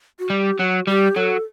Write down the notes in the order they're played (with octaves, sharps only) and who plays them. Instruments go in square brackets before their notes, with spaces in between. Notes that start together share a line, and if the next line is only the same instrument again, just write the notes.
[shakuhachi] F#4
[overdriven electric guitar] G3 [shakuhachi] G4
[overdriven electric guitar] F#3 [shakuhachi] F#4 G4
[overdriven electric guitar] G3 [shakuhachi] G4
[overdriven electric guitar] F#3 [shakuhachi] A4